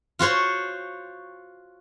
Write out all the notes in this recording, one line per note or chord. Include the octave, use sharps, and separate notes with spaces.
F4 F#4 C5 C#5